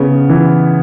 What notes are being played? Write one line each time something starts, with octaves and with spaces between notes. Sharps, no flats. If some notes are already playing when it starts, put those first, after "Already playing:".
Already playing: C#3 B3
E3